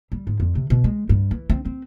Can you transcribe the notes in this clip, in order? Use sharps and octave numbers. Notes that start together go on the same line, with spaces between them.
G3
G#2
F2
C3
B2
G#3
G2
E3
C4
C4